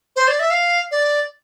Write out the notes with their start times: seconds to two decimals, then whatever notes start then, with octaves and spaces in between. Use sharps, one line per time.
0.16 C5
0.28 D5
0.39 E5
0.50 F5
0.91 D5